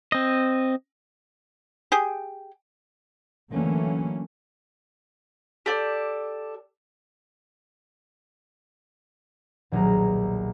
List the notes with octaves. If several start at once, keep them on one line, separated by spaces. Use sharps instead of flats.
C4 D#5
G4 G#4
D3 E3 F#3 A3 A#3 C#4
G4 A4 D5
D#1 B1 G#4 A#5